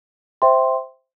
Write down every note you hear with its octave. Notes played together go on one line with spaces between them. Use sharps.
C5 E5 G5 C6